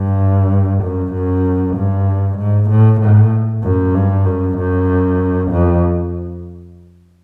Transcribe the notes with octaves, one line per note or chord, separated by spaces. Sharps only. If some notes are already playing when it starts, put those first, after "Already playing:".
Already playing: G2
F#2
F#2
G2
G#2
A2
A2
F#2
G2
F#2
F#2
F2